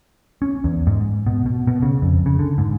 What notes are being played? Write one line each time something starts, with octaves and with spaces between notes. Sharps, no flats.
C#4
E2
G#2
B2
B2
B2
C#3
F2
C#3
D3
G#2